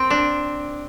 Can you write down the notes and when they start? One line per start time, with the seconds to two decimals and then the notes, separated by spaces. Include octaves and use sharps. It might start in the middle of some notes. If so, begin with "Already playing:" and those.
Already playing: C4
0.10 D4